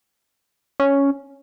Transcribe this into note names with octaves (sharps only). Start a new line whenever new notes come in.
C#4